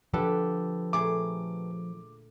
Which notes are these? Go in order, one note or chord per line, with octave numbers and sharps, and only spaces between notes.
D3 F3 G4 A4 B4
A#2 A3 G#4 D6